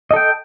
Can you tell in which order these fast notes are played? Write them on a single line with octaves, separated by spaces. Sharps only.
D#5 A4 G5